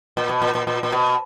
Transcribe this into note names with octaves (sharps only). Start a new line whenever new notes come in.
A#2
B2
A#2
A#2
A#2
A#2
B2